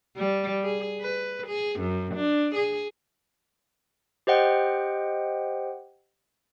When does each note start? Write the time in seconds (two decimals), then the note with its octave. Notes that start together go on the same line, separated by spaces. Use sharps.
0.17 G3
0.63 G#4
1.01 B4
1.47 G#4
1.80 F#2
2.15 D4
2.55 G#4
4.27 G4 C5 D#5 F#5 G5